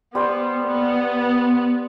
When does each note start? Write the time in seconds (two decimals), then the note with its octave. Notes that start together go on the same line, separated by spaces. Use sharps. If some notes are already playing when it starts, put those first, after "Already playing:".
0.15 G3 B3 C5
0.66 B3